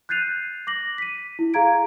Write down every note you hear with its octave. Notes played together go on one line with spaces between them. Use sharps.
F#6 G6 A6 C7 D#7 F7
D6 A#6 F#7
B6 D#7
E4
G#4 F5 A#5 G#6 D7